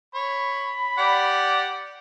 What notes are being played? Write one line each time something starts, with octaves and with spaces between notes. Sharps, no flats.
C#5 B5
G4 D5 F#5